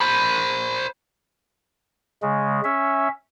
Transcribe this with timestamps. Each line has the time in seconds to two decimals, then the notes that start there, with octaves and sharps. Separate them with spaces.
0.01 C5 B5
2.22 C#3 G#3
2.64 C#4 E5